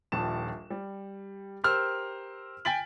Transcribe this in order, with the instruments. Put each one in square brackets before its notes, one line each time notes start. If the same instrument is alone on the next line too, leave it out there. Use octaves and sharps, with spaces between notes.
[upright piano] D#1 A#1 A5 E7
G3
G4 A#4 C5 E6 F6
G5 G#5 A6 B6 D7 F#7